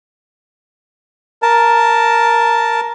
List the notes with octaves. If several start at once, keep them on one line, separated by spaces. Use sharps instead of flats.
A#4 A5